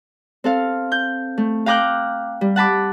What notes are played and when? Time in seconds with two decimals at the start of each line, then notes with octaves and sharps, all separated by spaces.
0.44 C4 A4 F5
0.92 G6
1.38 A3
1.66 F5 G5 A#5 D6 F#6 G6
2.41 G3
2.56 F#5 A5 B5 D6